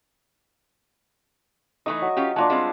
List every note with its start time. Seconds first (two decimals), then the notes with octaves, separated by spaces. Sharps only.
1.86 E3 A3 D#4 D#5 C#6
2.02 F#3
2.17 C#4 F4 G4
2.36 F#3 A#3 D4 F4 A5
2.50 G3 G#3 C4